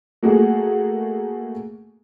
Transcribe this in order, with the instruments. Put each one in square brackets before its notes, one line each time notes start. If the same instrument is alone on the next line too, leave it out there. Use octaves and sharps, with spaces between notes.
[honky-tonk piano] A3 A#3 F#4 G#4